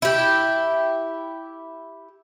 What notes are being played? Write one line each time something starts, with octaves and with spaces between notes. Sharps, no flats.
E4 G4